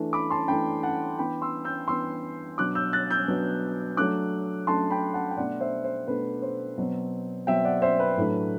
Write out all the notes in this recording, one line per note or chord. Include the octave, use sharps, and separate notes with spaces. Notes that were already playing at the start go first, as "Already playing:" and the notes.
Already playing: E3 A3 D4
B5 D6
A5 C6
E3 A3 D4 G5 B5
F#5 A5
E3 B3 D4 G5 B5
C6 E6
E6 G6
E3 B3 D4 C6 E6
B2 F#3 B3 D4 D6 F#6
E6 G6
F#6 A6
E6 G6
B2 F#3 B3 D4
F#3 A3 D4 D6 F#6
F#3 A3 D4 A5 C6
G5 B5
F#5 A5
G5
B2 A3 D4 D5 F#5
C5 E5
C5
B2 A3 D4 B4
C5
B2 F#3 C4
B2 F#3 C4 E5 G5
D5 F#5
C5 E5
B4
A2 F#3 A3 D4